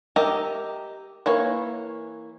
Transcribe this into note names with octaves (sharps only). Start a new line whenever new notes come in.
G4 A#4 D#5 E5 A#5
E3 A#3 C#5